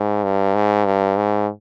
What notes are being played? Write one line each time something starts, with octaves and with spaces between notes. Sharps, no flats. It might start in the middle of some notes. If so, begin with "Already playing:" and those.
Already playing: G#2
G2
G#2
G2
G#2